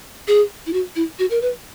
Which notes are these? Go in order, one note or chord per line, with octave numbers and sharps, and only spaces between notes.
G#4
E4
F#4
E4
F#4
A#4
B4